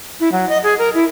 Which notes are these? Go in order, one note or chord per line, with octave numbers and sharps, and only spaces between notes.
E4
F#3
D#5
G#4
A#4
E4